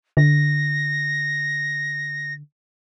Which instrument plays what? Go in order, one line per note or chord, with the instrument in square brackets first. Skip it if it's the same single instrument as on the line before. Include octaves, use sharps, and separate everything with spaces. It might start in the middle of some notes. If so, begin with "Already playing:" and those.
[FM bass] D3 [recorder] A#6